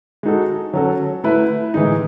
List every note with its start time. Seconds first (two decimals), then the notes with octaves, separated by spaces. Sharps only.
0.23 G#3 D#4 F#4 A4
0.73 F#3 C#4 F#4 A4
1.24 A3 E4 B4
1.74 A2 E3 G#3 D#4